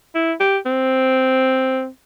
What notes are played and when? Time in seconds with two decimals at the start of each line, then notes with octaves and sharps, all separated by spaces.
0.15 E4
0.40 G4
0.66 C4